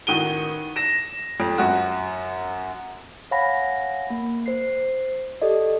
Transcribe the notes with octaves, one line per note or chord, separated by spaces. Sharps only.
A1 D#3 F#4 D#7 G7
A#6 E7
F2
F#2 F#4
C#5 F5 F#5 G#5 B5 A#6
A#3
C5 C7
G4 A4 D5 D#5